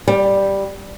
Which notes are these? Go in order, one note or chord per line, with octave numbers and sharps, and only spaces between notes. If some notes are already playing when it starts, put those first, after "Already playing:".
G3